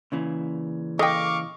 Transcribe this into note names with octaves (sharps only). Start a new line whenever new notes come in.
A#2 C#3 E3
A4 D#5 F5 G5 C#6 D6